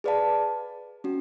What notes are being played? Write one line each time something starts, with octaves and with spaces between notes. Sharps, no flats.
G#4 B4 D5 F5 A5
C#4 F#4